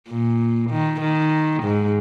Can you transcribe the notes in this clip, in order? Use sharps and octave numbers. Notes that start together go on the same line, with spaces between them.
A#2
D#3
D#3
G#2